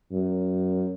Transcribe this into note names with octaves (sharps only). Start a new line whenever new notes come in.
F#2